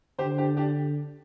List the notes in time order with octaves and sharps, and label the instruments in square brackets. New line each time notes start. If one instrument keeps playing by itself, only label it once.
[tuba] D3 [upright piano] G4 C5
[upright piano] D4 G4
D4 G4